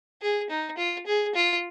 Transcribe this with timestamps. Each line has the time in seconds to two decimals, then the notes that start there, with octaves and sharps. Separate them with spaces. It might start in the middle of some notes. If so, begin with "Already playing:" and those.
0.22 G#4
0.50 D#4
0.78 F4
1.06 G#4
1.35 F4